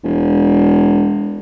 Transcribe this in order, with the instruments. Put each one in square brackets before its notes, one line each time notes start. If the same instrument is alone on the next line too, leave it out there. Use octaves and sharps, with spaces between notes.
[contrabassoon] E1